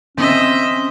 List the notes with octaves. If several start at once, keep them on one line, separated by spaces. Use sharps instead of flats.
C4 C#4 D#5 E5